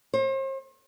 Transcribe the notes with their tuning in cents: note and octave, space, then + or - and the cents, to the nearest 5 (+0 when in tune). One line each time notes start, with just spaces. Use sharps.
C5 +40